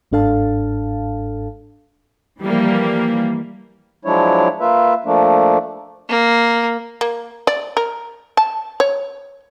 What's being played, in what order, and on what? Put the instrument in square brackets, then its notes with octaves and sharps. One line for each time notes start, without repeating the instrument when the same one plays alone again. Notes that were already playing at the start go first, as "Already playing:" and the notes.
[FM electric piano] G1 G#2 D4 A4 F5 A5
[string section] E3 F3 G3 A#3
[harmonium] F3 F#3 G#3 D4 E4 C#5
A#3 F4 B4 E5
F3 A3 A#3 D4
[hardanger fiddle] A#3
[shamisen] A#3
D5
A#4
A5
C#5